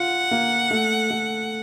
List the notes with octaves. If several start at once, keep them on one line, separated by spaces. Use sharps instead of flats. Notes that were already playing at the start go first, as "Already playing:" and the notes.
Already playing: F4 F#5
A#3
A3
A3